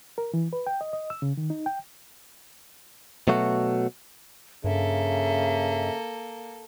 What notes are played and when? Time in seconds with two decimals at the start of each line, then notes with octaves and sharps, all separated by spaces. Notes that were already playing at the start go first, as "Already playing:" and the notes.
0.18 A#4
0.34 E3
0.53 B4
0.67 G5
0.81 D#5
0.93 D#5
1.10 E6
1.22 C#3
1.37 D#3
1.50 D#4
1.66 G5
3.28 B2 F#3 A3 F#4
4.64 G2 C#3 A#3 A4 E5